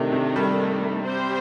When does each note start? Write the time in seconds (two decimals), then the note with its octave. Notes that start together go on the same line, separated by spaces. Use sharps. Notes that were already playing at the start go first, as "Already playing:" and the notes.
Already playing: C3 D#3 A3 D4
0.12 C3
0.36 G3
1.05 C4 G4 C5